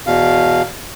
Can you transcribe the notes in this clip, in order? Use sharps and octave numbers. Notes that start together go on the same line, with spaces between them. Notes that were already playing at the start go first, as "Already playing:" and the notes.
E2 B2 F5